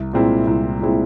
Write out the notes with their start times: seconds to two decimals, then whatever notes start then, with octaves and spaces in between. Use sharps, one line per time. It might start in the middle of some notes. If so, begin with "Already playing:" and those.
Already playing: C2
0.13 A#2 G#3 C4 E4
0.47 C2
0.81 A#2 G#3 C4 E4